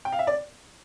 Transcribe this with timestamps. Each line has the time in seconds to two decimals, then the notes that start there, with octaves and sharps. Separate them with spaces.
0.05 G5
0.12 F5
0.19 E5
0.27 D5